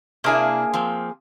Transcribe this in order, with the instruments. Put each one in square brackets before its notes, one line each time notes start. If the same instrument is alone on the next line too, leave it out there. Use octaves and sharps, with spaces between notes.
[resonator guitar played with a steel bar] C3 D4 E4 [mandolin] A#3 G#4
[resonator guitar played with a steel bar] F3 C4